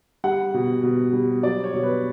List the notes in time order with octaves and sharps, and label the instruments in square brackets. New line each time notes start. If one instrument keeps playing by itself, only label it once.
[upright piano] G3 F#5
B2
B2
G3
F#3 D5
C#5
B2
B4